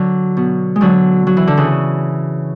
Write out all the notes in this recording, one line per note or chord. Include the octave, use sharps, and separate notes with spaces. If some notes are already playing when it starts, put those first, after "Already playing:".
Already playing: D3 F#3
B2
G#3
D3 F#3
F#3
E3
D3
C#3 E3